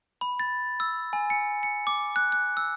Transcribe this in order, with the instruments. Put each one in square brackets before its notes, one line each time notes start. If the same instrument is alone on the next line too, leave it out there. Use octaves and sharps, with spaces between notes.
[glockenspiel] B5
A6
E6
G#5
C#7
C#7
D6
F#6
F#6
E6